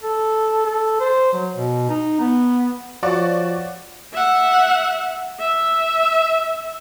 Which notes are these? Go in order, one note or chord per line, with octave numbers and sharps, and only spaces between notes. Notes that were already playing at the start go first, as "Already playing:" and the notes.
A4
A4
C5
F#3
B2
D#4
B3
F3 F#4 C#5 D5 F5 C#6
E5 F#5
E5